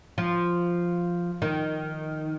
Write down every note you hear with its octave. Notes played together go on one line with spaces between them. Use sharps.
F3
D#3